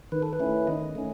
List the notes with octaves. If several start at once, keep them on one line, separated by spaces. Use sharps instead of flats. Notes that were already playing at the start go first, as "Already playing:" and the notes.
D#3 B4
A4
B4
A3 C#4 E4
D#3 D#5
A3 C#4